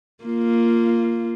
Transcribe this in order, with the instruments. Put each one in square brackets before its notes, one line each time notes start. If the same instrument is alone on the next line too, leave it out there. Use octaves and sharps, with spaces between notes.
[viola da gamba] A#3 F4